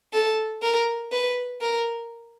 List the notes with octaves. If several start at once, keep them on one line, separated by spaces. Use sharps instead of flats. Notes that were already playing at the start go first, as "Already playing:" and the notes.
A4
A#4
B4
A#4